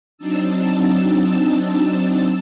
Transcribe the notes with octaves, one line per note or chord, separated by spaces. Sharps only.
F#3 C4 D4 D#4 A5 E6